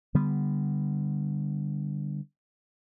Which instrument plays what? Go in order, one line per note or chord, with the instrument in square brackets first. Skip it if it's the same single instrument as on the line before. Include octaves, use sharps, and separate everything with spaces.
[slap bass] D3 G3 B3